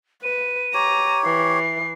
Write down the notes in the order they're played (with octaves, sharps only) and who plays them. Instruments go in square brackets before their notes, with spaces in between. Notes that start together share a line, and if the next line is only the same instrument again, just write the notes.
[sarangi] B4 [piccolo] D#7
[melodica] G4 C#5 [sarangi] A#5
[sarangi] E3 [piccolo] C7